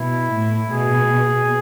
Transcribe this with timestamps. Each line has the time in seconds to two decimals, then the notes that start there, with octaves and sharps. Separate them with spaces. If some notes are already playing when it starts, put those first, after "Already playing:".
Already playing: B2 E4
0.32 A2
0.71 B2 G#4